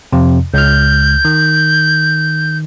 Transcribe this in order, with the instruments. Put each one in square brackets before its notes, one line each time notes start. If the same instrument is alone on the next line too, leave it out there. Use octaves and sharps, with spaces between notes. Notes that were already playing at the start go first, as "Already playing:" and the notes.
[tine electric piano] F2 C3
[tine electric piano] C#2 F6 [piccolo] G6
[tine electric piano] D#3